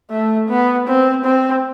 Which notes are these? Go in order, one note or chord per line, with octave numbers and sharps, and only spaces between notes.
A3
B3
C4
C4